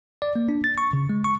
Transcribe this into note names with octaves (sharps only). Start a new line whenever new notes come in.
D5
A#3
D4
A6
C#6
C#3
G#3
C#6